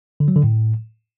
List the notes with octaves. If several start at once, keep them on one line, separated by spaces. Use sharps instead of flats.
D3
F#3
D3
A2